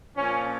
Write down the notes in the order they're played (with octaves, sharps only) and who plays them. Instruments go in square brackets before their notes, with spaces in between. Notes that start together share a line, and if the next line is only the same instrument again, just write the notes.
[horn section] A#2 F3 C#4